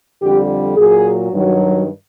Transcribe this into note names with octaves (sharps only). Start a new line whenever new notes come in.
F2 D3 G3 G4
A#2 F#3 G#4
G2 D#3 F#3